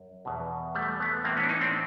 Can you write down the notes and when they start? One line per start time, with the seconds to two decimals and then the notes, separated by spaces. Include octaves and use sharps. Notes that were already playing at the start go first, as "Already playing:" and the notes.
Already playing: F#2
0.25 E2 B2
0.75 G3 A3
1.00 A3 B3
1.24 A2 E3 A#3 C4
1.37 B3 C#4
1.43 D4
1.49 C#4 D#4
1.61 C4 D4